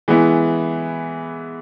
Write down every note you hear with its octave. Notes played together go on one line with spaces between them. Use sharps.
E3 G#3 B3 E4